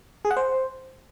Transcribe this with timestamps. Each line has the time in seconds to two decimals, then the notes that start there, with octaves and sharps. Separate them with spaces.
0.25 G#4
0.31 F#5
0.37 C5